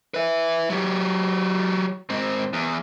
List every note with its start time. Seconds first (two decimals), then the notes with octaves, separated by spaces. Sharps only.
0.14 B4 E5
0.70 F#3 G4
2.10 G#2 C4
2.53 E2